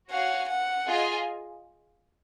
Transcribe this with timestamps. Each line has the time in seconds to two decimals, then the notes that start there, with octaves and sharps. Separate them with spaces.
0.11 F#4 C#5 F5 F#5 G#5
0.49 F#5
0.87 F4 G#4 D#5 G#5